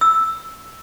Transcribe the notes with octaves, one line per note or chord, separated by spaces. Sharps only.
E6